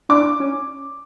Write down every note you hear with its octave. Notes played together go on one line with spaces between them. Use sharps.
D4 D6
C#4